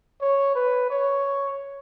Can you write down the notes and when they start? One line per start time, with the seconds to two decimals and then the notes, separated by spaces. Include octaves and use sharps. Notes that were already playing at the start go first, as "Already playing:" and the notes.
0.21 C#5
0.55 B4
0.90 C#5